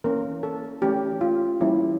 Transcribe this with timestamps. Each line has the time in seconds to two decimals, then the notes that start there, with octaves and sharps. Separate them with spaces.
0.04 E3 A#3 C#4 A#4
0.43 A4
0.82 E3 A3 C#4 G4
1.21 F4
1.60 E3 G3 A#3 C#4 E4